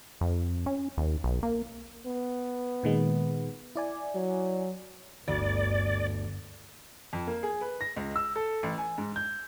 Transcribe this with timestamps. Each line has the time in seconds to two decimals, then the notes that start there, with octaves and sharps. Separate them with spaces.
0.21 F2
0.66 C#4
0.97 D#2
1.24 B1
1.43 A#3
2.06 B3
2.83 A#2 D#3 G#3
3.75 E4 D5 G#5
4.15 F#3
5.28 G1 D2 D5
7.13 F2
7.27 A#3
7.43 G#4
7.61 B4
7.81 A#6
7.96 C#2
8.16 E6
8.36 A4
8.63 A1
8.78 G#5
8.98 G#2
9.16 G6